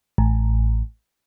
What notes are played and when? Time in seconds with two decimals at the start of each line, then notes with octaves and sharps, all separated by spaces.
0.18 A1